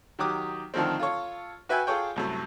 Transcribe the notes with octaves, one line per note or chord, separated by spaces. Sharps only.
D#3 F#3 G4 D6 D#6
D3 D#3 F3 A3 C4
F4 A4 C#5
F#4 B4 E5 G5 G#5
F4 G#4 A4 C#5 G5
C2 F#2 A3